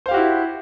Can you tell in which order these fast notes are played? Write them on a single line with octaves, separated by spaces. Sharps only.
C5 F5 G4 F#4 E4